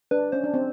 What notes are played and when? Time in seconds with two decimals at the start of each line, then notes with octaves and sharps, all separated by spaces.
0.11 D4 B4
0.32 C#4 C5
0.44 D4
0.54 C4